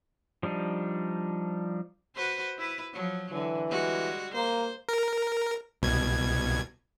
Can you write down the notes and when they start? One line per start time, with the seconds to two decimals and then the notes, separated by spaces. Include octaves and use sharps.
0.43 F3 G3 D4 D#4
2.16 F#4 B4 C5
2.58 E4 B4
2.93 F3 F#3
3.32 D3 E3
3.69 G3 G#3 F#4
4.34 A#3 C5
4.89 A#4
5.82 C2 B2 G#6